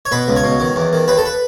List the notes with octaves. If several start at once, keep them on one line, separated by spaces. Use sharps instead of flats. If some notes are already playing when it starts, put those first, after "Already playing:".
C#5
B2 B4
C#2
C#5
B2
D#3
E2
D#3
D#2 B4
A4
B4